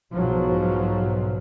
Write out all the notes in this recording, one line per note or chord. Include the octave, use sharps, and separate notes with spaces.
B1 G#2 B2 F3 F#3